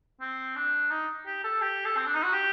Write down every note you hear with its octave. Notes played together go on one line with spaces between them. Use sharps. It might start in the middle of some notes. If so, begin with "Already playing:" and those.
C4
D4
D#4
G4
A4
G4
A4
C4
D4
D#4
F#4
G4